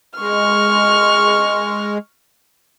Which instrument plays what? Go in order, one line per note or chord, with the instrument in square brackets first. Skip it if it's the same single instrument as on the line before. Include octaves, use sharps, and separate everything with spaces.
[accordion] G#3 [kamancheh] C#6 F6